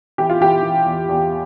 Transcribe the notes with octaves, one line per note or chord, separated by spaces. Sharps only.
E3 G4
F4
E3 G4
E3
E2
E2